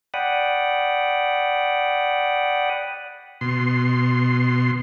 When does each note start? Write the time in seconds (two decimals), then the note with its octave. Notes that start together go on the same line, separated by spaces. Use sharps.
0.14 D5 F#5 G5 B5 D#6
3.41 B2 C6